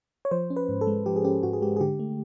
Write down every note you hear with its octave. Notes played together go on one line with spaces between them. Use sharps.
C#5
F3 C5
C#4
B4
G#2
A4
G#3
F3 G4
G#4
C#4 G4
G#2 F#4
G#4
G#3 G4
G#4
D3 G4
A3